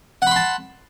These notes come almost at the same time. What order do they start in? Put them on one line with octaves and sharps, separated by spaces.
F#5 B5 C6 A5